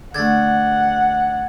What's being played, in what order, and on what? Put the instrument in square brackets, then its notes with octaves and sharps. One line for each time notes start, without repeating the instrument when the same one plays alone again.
[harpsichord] D3 A3 [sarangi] F#5 [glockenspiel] G#6 A6